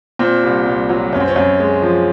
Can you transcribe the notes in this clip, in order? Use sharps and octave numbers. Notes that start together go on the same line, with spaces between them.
A#2 C4
C2
C2
F#3
F#2 C#4
C4
C#4
F#2
G#3
F3